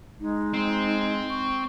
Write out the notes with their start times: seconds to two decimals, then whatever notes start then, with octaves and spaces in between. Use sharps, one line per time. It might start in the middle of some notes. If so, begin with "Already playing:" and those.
0.20 G#3 D#4
0.54 G#3 C4
1.30 C#6